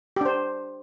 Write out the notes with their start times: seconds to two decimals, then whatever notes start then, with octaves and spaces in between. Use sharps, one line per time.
0.16 G4
0.21 D4
0.25 C5